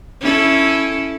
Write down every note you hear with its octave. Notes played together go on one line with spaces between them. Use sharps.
C#4 E4 A4